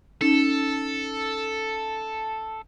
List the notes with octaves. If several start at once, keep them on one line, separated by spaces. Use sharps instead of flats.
C#4 D#4 A4